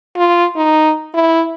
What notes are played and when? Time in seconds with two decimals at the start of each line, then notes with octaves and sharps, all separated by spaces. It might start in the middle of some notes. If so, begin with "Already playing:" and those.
0.16 F4
0.56 D#4
1.14 E4